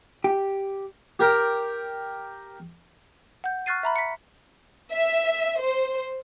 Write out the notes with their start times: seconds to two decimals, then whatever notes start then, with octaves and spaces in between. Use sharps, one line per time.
0.24 G4
1.19 G4 A#4 G5 A#5
3.44 F#5 G6
3.66 C#6 F6 F#6 A6 C7 D#7
3.83 E5 A#5 B5
3.96 B6 C#7
4.90 E5
5.61 C5